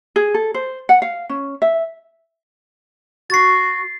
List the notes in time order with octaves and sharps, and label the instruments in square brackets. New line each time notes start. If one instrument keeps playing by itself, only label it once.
[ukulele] G#4
A4
C5
F#5
F5
C#4
E5
[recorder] F#4 [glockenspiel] A6 C7